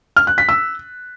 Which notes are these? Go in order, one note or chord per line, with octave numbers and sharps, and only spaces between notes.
F6
F#6
B6
E6